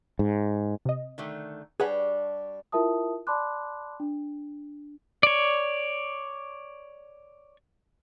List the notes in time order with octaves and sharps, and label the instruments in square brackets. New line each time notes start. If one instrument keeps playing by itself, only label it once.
[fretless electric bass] G#2
[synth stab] C3 D#5
[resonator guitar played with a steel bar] D3 D#3 A3
[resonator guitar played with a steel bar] G3 D4 C#5 [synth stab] G#4 B4 F#5
[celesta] E4 F4 A#4 E5 A5 D#6
D5 A5 B5 C6 D6 F#6
D4
[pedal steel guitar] C#5 D5